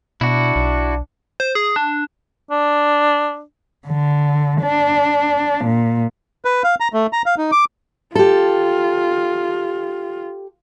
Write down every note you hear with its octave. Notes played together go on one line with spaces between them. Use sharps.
B2 D4 E4 F#4
B1
C5
G#4
D4
D4
D3
D4
A#2
B4
F5
A#5
A3
A#5
F5
D#4
D6
F4 G4 A4